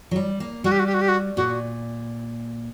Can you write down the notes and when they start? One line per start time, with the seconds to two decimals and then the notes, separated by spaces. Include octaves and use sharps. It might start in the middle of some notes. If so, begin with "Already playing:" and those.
0.11 F#3
0.16 G3
0.40 A#3
0.64 G3 F#4
0.72 G4
0.79 F#4
0.87 G4
0.94 F#4
1.02 G4
1.08 F#4
1.36 A#2 F#4